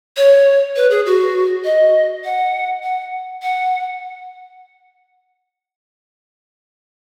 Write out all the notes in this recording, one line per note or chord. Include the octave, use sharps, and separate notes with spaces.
C#5
B4
G#4
F#4
D#5
F#5
F#5
F#5